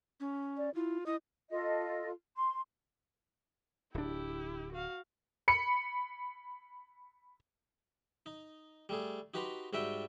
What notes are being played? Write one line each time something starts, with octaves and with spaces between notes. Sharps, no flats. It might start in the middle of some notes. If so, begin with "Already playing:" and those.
C#4
D5
E4 F4
E4 D#5
F4 A4 D#5
C6
D1 D4 E4 G4
F#4 F5
B5 C#7
D#4
G3 A3 G#4
D#4 F#4 G4 B4 A#5 C6
G#2 G3 F#4 E5 G5